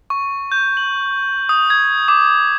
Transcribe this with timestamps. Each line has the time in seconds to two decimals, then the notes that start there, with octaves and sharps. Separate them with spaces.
0.10 C#6
0.52 G6
0.77 F#7
1.49 D#6
1.70 G#6
2.08 D6